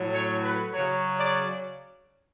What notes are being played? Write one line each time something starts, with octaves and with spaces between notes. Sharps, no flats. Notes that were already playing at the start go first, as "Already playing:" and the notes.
Already playing: A2 F#3
C#5
B4
C#3 F#3 C#5
D5